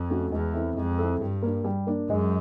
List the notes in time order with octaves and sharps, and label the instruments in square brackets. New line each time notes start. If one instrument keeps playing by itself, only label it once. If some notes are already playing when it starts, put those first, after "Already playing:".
Already playing: [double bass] F2
[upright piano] A3 C#4 F#4
[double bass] E2 [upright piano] G#3
[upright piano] C4 E4 A4
[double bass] F2 [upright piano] G#3
[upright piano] C4 E4 A4
[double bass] G2 [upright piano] G3
[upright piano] A#3 D4
G3
A#3 D4
[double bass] F#2 [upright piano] G#3